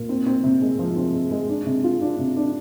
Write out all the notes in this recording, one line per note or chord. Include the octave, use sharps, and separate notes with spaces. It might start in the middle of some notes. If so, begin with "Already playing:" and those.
Already playing: A#2
C4
C4
C3
G#3
F3
C4
G#3
G#3
D4
C3
F4
D4
C3
D4